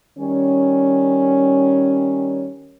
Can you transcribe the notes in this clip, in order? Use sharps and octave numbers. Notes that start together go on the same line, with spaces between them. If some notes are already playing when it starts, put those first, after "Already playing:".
D#3 G3 C#4